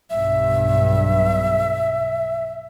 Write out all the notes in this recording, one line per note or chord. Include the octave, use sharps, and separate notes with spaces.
B1 G2 E5